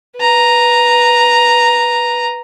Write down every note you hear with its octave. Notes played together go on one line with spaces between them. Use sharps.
B4 A#5